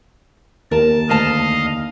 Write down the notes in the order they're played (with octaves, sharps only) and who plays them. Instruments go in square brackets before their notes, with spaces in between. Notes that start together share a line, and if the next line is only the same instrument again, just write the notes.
[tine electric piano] D#2 [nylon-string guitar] A#4 [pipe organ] A5
[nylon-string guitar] D2 A5 [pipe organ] D#5 F5